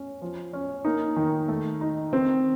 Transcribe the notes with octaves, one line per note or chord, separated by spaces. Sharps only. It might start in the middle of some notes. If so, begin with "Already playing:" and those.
Already playing: C#4
F3
C#4
A#3 D#4
D#3
A3
D#4
D#3 C4